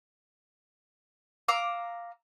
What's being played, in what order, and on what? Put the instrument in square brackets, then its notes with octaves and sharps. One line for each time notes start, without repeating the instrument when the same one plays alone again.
[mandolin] F5 A#5 D6 E6